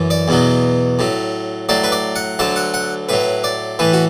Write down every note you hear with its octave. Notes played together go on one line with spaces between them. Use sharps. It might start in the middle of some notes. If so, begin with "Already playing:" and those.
Already playing: F#2 E3
D5
E2 B2 F#3
A2 F#3
A2 F#3 D5
B4
D5
F#5
D2 D3 F#3 A5
F#5
F#5
A2 F#3 B4
D5
A2 E3 B4
F#4